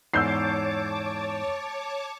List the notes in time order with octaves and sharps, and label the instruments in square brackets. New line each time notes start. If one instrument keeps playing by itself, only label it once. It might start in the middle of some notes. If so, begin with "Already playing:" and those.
[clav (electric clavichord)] E2 G#2 [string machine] C#5 A5 D6 [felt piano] E6 G6 C7